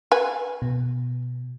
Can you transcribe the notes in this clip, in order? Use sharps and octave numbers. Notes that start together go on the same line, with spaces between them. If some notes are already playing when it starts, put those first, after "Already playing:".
B4 G#5
B2